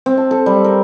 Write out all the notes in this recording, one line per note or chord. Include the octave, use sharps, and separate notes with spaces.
C4
A5
A4
G3
A#4